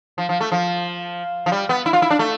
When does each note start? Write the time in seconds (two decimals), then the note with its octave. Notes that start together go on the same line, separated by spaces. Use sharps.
0.18 F3
0.29 F3
0.41 A3
0.52 F3
1.46 F3
1.52 G3
1.69 B3
1.86 E4
1.93 F4
2.02 E4
2.10 D4
2.19 A3